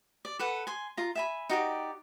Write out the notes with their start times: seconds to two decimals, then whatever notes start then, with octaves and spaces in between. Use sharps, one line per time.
0.25 D5
0.39 A4 B4 F#5
0.67 G#5 C6
0.97 F4 A#5
1.15 E5 G#5 B5
1.49 D#4 F#4 G4 D5